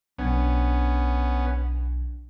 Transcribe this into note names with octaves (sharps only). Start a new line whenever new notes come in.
B1 B3 C#4 D4 G5 G#6